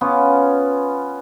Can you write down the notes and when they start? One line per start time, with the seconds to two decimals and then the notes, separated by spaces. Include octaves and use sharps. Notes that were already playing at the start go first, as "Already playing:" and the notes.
0.01 B3 C#4 F4